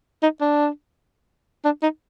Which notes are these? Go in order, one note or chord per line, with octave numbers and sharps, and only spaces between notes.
D#4
D4
D4
D#4